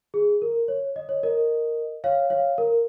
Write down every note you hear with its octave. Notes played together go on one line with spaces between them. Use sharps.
G#4
A#4
C#5
D#5
C#5
A#4 D#5
C#5 F5
C#5 F5
A#4